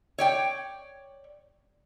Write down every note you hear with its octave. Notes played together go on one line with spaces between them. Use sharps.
C#5 D5 G5